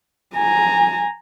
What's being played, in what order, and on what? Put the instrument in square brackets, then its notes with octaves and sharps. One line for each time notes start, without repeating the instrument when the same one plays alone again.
[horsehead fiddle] G#5 A#5